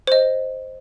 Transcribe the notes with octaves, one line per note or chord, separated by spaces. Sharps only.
C5 D#5